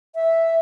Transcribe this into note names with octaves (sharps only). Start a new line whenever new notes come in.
E5